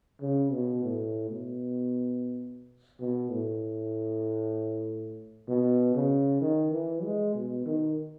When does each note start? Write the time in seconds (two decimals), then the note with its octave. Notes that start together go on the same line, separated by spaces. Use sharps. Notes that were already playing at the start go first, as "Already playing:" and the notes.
0.21 C#3
0.52 B2
0.84 A2
1.30 B2
3.00 B2
3.31 A2
5.48 B2
5.95 C#3
6.42 D#3
6.72 E3
7.03 G#3
7.35 B2
7.66 D#3